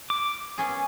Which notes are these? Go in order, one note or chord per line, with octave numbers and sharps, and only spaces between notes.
D6
B3 C#4 G#4